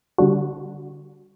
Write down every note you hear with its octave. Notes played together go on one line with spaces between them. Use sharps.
D3 G3 D4 F#4